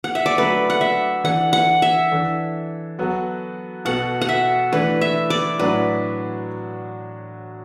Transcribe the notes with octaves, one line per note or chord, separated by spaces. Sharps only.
F#5
E5
D5
D3 F#3 A3 B4
F#5
E5
E3 D4 A4 F#5
F#5
E5
E3 D4 A4
F#3 B3 F#4 A4
B2 B3 F#4 A4 F#5
F#5
E5
E3 A3 D4 B4
E5
D5
A2 F#3 D4 F#4 B4